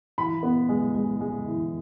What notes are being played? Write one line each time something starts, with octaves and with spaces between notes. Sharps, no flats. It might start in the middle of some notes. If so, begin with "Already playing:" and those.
E3 B5
B3
G#3
G#3
G#3
E3